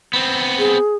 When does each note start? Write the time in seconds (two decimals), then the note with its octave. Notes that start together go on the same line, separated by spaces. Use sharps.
0.13 B3 C4
0.59 G#4